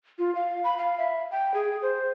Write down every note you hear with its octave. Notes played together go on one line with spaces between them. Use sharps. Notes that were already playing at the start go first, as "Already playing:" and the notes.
F4
F5
B5
F5
E5
G5
G#4
C5